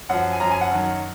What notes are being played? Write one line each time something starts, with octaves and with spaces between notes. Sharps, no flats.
F#2 F3 F#5
G#5
F#2 F3 A#5
G#5
F#5
F#2 D#3 F#3